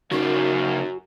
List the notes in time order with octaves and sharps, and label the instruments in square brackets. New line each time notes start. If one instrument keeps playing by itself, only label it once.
[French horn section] F#2 [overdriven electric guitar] C#3 A#3 [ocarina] D#4 [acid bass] F#4